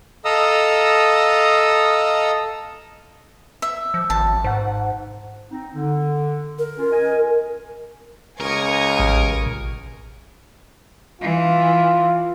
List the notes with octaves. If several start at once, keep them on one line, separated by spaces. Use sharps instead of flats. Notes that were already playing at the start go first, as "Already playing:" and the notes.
A4 D#5 F5 A#5 D#6 E6
E5
F3
G#1 A5
G#2 C5 F#5
C4 D#4
D3
A#4
C#4 F4
D#5 G#5
C#2 A#4 G#5 C#6 D#6
A1
E3 F4